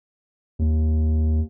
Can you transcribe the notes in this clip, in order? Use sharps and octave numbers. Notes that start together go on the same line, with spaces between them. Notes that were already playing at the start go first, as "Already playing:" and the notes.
D#2